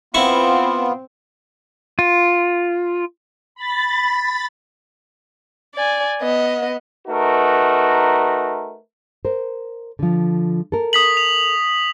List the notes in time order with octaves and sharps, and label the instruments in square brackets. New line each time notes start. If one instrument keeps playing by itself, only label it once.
[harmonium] B3 F4 [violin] C4 [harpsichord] E4 C#6
[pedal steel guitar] F4
[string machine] B5 A6
[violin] D5 G#5
B3 D#5
[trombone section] A3 D#4 F#4 A#4 B4
[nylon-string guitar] A#4 C5
D3 F3
A4 A#4
[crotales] D#6 B6 F#7
F7